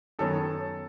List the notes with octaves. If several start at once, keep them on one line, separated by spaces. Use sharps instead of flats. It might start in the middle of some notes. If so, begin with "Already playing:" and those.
F#2 D#3 F#3 B3 A4